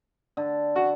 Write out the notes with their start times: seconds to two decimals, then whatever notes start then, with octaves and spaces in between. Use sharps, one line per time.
0.37 D3
0.76 F#4